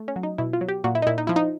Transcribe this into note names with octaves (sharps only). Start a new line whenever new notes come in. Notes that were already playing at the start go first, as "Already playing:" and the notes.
Already playing: A3
C#4
F#3
D#4
B2 E4
F4
F#3
G4
A#2 F#4
E4
D#4
A#2 E4
D#4
F3 E4
D#4